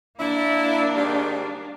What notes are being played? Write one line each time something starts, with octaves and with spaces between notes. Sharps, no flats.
A#3 D4 E4
G#2 D#3 G3